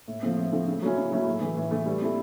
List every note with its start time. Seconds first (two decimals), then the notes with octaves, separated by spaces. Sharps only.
0.08 A2
0.23 F3 A3 C4
0.37 A2
0.53 F3 A3 C4
0.67 C#3
0.83 F#3 A3 C#4 E4
0.97 C#3
1.12 F#3 A3 C#4 E4
1.26 A2
1.41 E3 A3
1.57 A2
1.71 E3 A3
1.86 G3
2.01 C4 E4 A4